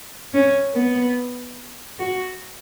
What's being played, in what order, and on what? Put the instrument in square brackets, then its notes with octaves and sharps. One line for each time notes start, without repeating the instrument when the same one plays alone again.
[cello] C#4
B3
F#4